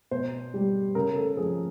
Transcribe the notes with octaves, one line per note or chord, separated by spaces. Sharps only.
B2 C5
G3
C#3 A#4
A4
F3 G#4